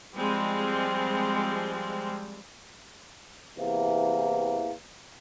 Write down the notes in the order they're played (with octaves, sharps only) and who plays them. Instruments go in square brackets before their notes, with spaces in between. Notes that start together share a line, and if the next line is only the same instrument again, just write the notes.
[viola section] F3 G3 G#3 C4
[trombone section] E2 C3 E3 A#3